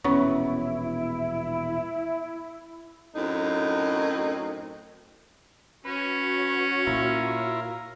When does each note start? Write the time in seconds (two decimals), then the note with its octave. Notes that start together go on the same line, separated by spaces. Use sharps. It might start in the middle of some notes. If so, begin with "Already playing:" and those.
0.04 E1 A#1 B3 C#4 E4 C#5 C#6
3.15 F#2 A2 C4 D#4
5.85 C#4 F#4 B4 C#5
6.87 A#2 E4 F4 A#4